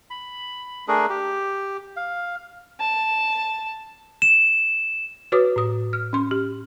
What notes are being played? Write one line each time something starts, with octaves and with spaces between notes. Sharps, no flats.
B5
A3 D4 G#4 A#4
G4
F5
A5
E7
F#4 B4 C#5 D6 D#6
A2 D#6
F6
C#4 C6
G4